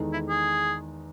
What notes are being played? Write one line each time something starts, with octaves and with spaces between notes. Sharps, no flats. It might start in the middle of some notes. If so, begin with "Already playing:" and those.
Already playing: E2 D#3 G#3 D#4 A4
E4
G#4